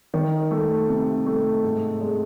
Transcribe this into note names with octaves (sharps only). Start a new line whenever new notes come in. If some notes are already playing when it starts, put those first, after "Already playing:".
D#3
A3
C3
A3
G#2
G#3